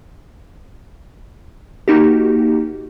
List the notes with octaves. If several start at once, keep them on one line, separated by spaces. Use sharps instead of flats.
A#3 D#4 F#4 G4